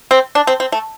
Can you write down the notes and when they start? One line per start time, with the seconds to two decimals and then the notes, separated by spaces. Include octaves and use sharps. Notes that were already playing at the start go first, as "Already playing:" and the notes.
0.11 C4
0.35 D4
0.47 C4
0.60 C4
0.72 A3